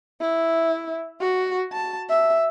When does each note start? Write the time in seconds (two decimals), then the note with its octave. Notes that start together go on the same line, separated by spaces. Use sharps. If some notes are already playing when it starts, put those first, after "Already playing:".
0.21 E4
1.21 F#4
1.73 A5
2.09 E5